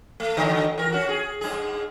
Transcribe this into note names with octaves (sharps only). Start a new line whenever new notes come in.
A3
D3 F#3 A3
E3 A#4
C#4 F#4
G#4
G2 G#4